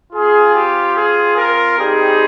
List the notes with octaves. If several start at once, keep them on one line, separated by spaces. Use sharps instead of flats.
C4 F4 G#4
G4
G#4
A#4
G3 C4 D#4 G4 G#4